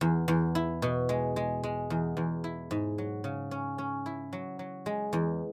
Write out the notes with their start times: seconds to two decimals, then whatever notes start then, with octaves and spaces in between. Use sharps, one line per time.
0.01 E2
0.28 E2
0.55 E4
0.82 B2
1.09 G#3
1.36 G#3
1.64 G#3
1.90 E2
2.17 E2
2.44 E4
2.71 G#2
2.98 F#3
3.24 C#3
3.51 C#4
3.78 C#4
4.06 E4
4.33 F#3
4.59 F#3
4.86 G#3
5.13 E2